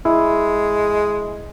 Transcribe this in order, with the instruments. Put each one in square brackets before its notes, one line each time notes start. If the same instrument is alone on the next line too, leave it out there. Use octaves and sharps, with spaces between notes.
[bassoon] G#3 [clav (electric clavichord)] E4